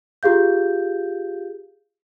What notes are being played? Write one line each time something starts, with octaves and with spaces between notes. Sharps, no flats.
F4 G4 G#4 F5 G6